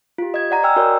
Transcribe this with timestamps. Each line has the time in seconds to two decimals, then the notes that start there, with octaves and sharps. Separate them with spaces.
0.18 F4 G4
0.34 D#5 G#6
0.51 D5 F#5 A#5
0.63 D#5 G5 G#5 A#5 E6 F6
0.76 F#4 A#4 C#5 D5